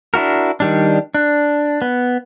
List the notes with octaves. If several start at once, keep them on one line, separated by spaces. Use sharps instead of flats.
D4 E4 F#4 A#4
D#3 G3 D4
D4
B3